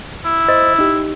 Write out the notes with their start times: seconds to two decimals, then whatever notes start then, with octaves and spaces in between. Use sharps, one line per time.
0.25 E4
0.49 C5 D#5 A6
0.79 D#4 G4